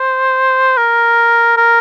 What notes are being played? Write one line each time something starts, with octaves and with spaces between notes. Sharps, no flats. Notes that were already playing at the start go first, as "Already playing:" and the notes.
Already playing: C5
A#4
A#4